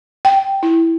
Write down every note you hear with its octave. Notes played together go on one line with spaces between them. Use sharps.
G5
E4